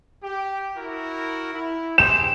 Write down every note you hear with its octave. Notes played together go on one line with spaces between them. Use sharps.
G4
E4 F#4 A#4
E4
G4 G#4 C5 E7